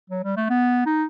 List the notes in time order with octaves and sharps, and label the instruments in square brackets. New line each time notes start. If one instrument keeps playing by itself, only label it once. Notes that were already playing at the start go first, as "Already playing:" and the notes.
[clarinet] F#3
G3
A3
B3
D#4